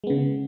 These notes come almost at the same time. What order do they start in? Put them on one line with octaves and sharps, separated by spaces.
G#3 B3 C#3